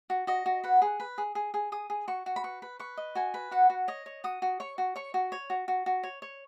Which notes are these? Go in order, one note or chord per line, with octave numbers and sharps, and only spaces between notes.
F#4
F#4 D#5
F#4
B4 F#5
G#4
B4
G#4
G#4
G#4
G#4 D#6
G#4
F#4 C#6
F#4
B5
B4 C#6
B4
B4 C#6
D#5
F#4 G#5
B4
F#4 F#5
F#4
C#5 D#5
C#5
F#4 D#6
F#4
C#5 C#6
F#4
C#5 C#6
F#4
C#5
F#4
F#4
F#4
C#5
C#5